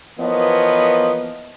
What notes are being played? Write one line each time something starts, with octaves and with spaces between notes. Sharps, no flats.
E3 F3 A#3 B3 C#5 D#5